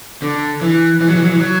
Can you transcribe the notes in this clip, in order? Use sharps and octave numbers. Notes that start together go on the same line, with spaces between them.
D3
E3
E3
F#3
E3
F#3
E3
F#3